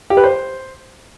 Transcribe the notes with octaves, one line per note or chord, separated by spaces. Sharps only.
G4
B4
C5